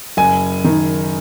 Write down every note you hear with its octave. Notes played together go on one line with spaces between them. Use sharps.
F#1 G#5
D#3